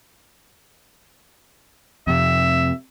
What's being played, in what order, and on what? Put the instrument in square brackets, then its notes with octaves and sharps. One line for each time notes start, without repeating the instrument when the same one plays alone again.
[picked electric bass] F2 C3 [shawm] E5